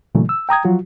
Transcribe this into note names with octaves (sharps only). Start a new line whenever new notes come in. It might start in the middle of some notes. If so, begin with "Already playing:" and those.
A#2 C#3 E3 F#3 A3
E6
G5 A#5 D#6 G#6
F3 F#3 F4 F#4